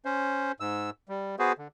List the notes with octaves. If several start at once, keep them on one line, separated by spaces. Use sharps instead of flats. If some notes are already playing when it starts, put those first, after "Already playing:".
C#4 C5
G#2 E6
G3
B3 F#4 G#4 B4 C5
D3